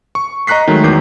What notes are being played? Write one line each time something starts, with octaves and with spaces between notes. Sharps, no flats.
C#6
D#5 A#5 C#6 F#6 B6 C7
D#3 F#3 G#3 A3
E2 D#3 F#3 D6 G6 C7